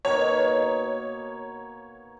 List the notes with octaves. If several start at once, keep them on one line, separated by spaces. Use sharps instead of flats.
B2 A#3 D#4 C#5